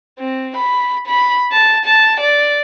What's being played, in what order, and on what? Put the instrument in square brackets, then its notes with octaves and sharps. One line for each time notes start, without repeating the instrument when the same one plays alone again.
[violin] C4
B5
B5
A5
A5
D5